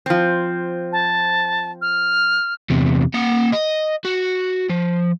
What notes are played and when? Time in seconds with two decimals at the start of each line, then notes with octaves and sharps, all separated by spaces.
0.06 F3 C4
0.92 A5
1.82 F6
2.70 E2 C3
3.14 A#3 F#5
3.53 D#5
4.05 F#4
4.70 F3